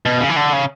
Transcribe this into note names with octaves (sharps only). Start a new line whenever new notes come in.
B2
C#3
E3
D3
C#3